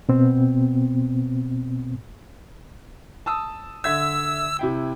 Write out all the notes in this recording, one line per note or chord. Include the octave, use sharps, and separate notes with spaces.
B2 B3 C4
A5 D#6 E6
D3 E5 E6 G#6
C3 E4 G5